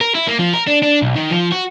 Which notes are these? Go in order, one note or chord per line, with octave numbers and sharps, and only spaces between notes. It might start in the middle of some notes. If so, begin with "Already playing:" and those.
A#4
E4
A#3
F3
A#4
D4
D4
B1
D#3
F3
F#4